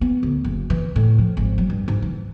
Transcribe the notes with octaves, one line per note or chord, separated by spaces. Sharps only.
B3
D2
F#1
E3
A2
F3
G#1
F#3
G2
G#2
E3